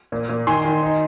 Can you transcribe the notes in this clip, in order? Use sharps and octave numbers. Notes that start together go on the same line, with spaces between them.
A#2
A#2
D#3 G#5 C6
D#3
D#4